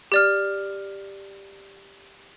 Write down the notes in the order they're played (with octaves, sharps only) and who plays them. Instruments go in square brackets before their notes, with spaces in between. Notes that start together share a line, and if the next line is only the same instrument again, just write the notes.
[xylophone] G4 D5 F6